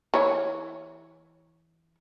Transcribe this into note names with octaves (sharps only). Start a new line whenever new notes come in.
E3 C#5